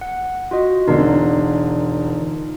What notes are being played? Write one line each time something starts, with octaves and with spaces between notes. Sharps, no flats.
F#5
F4 F#4 D#5
E1 D3 D#4 F4 A#4